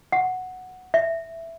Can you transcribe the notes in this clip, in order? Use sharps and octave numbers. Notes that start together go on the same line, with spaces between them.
F#5
E5